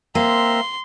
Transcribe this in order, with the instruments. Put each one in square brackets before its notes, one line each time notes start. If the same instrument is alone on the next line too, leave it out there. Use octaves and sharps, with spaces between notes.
[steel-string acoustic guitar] A#3 [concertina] C4 E5 A#5 [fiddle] C6